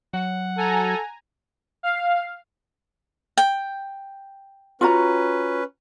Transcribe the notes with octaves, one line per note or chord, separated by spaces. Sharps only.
F#3 F#5
A4 G#5 A#5
F5
G5
C#4 F4 F#4 B4 A#5